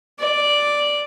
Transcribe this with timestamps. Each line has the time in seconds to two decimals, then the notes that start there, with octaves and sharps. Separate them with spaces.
0.19 D5